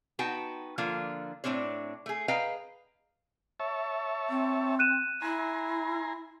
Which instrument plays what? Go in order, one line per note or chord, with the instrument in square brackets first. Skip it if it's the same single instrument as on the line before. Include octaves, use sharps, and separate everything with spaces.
[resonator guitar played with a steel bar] B3 D#4 F#4 G5 A5
D3 F3 A#3 F4
A2 G#3 C4 D4 C#5
A3 G#4
G#4 B4 D#5 F5 G5 A#5
[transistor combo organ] C#5 E5 A5
[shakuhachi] C4
[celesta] F#6 D#7 E7
[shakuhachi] E4 [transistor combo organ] G#5 A#5 C6